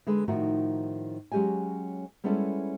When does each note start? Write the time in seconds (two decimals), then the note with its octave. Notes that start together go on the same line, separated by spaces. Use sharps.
0.07 D3 G#3 B4
0.28 A2 D#3 F3 D#4 F#4 A#4
1.32 F#3 G#3 C#4 G4 D#5 G#5
2.24 G3 G#3 B3 C#4 E4 A4